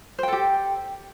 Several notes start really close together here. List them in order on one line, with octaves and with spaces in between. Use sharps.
C5 G5 A4 G4